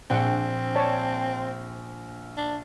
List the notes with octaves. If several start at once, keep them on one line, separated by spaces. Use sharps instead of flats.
A#1 C4 D4 F#5 G5
C#5 D5 A5
D4